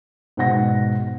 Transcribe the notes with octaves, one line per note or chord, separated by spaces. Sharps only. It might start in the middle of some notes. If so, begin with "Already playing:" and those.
G#2 B2 F#5 A#6